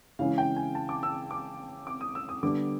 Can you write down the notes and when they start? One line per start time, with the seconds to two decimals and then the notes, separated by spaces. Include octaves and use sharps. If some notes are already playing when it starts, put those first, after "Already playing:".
0.19 C#3 E3 G#3 C#4 E4 F5
0.38 G5
0.56 G#5
0.75 A5
0.89 D6
1.03 E6
1.31 D6
1.87 D6
2.01 D#6
2.15 E6
2.29 D#6
2.43 D3 G3 B3 D4 D6